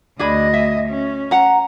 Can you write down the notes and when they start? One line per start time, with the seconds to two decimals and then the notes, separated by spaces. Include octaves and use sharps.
0.19 D2 D4 G#4 D#5 B5
0.54 E5
0.88 C#4
1.31 F#5 A#5